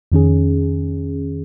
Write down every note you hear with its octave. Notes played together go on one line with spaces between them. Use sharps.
F2 D#3 C#4 G#4